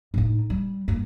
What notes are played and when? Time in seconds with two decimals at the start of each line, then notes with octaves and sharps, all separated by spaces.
0.14 A2 D#4
0.50 G3
0.88 G2 A#3